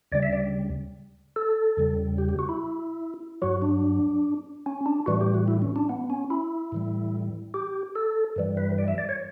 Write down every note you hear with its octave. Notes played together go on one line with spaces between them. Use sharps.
D2 C#3 G3 D5
E5
D5
A4
E2 C#3 G3
G4
G4
F#4
E4
G2 F#3 F#4
D4
C#4
D4
A2 E3 G3 F#4
G4
F#4
E4
C#4
D4
B3
C#4
E4
A2 E3 G3
G4
A4
G2 E3 G3
B4
D5
E5
D5
C#5